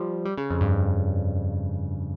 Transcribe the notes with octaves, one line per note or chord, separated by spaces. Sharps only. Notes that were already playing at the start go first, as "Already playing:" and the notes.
Already playing: F3 G3
G3
C#3
F2
G2